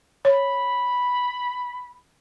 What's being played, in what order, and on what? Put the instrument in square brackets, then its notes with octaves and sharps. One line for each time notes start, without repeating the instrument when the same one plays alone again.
[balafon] C#5 [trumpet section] B5